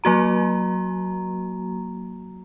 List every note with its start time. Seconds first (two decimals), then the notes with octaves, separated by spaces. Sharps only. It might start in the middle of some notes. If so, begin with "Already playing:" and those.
0.04 F#3 A#3 F#4 A#5